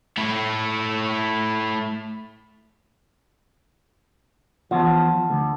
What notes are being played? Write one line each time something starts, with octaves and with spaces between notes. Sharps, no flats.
A3 E4
E2 F3 F#5 A5
D2